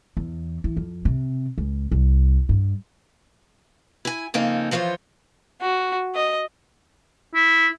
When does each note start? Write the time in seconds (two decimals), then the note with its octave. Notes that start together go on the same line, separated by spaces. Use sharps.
0.17 E2
0.64 E3
0.77 F2
1.05 C3
1.58 C#2
1.91 C2
2.49 G2
4.05 E4 G#5
4.34 F2 C#3 A#3 D#4 A4
4.71 E3 F3 F4 C5 C#5
5.61 F#4
6.15 D#5
7.34 E4